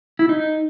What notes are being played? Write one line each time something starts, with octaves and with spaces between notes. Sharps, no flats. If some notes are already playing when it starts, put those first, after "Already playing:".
E4
D#4